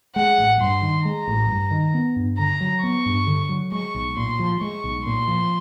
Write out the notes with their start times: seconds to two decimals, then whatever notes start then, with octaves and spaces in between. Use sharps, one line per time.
0.16 G#3 F#5
0.38 A1
0.61 G2 C6
0.82 D#3
1.05 G#3 A#5
1.27 A1
1.49 G2
1.71 D#3
1.94 B3
2.16 G2
2.38 D3 A#5
2.61 F#3
2.83 B3 C#6
3.06 G2
3.27 D3
3.49 F#3
3.72 G#3 C#6
3.94 B1
4.17 A#2 C6
4.39 F3
4.61 G#3 C#6
4.84 B1
5.05 A#2 C6
5.28 F3